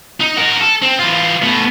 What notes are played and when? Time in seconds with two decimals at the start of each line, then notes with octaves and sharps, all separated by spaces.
0.21 D#4
0.37 F#4 A#4
0.61 A4
0.82 C4
0.99 E3 F4
1.43 A2 B3